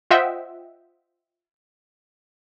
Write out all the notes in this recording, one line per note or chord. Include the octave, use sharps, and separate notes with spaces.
F4 C5 D#5 E5 F#5 G5